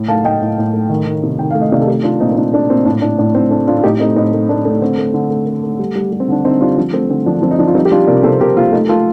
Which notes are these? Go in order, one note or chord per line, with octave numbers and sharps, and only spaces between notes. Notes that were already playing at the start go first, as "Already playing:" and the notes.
Already playing: A2
A3 F5 A5
A2 D#5 G5
A2
A2
A3
D#3
D#3
C3
D#3 G5
A3 F5
D#5
C3 D5 F5
A4
A3 D#4 G4
A3 D4 F4
A#2 C4 D#4
C4
A#2 D4
A3 D4
A#2 C4
A2 D4
A2 D4
A2 D4
A2 C4
A3 D4
A2 D4 F4
F4
A2 D#4 G4
A3 C4 D#4
A2 C4 D#4
A3
A3 D4
A3 D4
D3 C4
A3
D3
A3
A3
A3
G3
G3
G3
C4
D3 D4
D3 C4 D#4
G3 D4 F4
F3 D4
A3 C4
D3 C4
F3 D4
F3 C4
D#4
F3 D4
F4
G3 C4 D#4
G4
G3 D4 F4
C3 A#4 D5
C3 A4 C5
C3 G4 A#4
A#3 F4 A4
A3 D#4 G4
A3 F4 A4